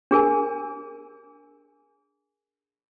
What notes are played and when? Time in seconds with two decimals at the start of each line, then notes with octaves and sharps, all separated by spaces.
0.11 D4 G#4 A#4 G#5